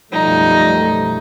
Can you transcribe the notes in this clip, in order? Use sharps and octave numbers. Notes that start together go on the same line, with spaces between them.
B1 F#2 F3 G3 A3 D#4